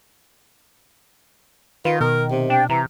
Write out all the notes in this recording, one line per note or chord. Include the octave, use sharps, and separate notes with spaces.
D#3 F4 B4
B2 A#4
C3
D4 G5
C3 E3 A#5